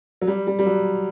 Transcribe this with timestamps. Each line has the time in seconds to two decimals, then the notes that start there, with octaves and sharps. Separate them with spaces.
0.21 F#3
0.27 G3
0.47 G3
0.59 G3
0.66 F#3